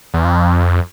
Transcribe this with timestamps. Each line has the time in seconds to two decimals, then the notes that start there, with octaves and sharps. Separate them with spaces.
0.14 E2
0.25 F2